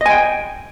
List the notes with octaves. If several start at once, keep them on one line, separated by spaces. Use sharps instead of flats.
D#5 G5 G#5